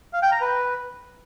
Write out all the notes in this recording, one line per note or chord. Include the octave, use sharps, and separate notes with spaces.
F5
G5
A#5
B4